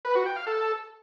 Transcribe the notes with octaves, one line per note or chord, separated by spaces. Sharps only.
B4
F#4
G5
F5
A4